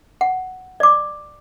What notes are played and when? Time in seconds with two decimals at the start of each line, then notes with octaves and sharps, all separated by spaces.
0.21 F#5
0.80 D5 D6